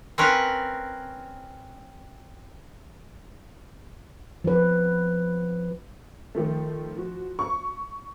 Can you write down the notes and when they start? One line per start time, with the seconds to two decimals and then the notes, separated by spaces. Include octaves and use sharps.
0.18 C4 C#4 A#4 B4
4.44 F3 B4
6.35 D#3 F3 A3
6.97 F3 F#4
7.39 C#6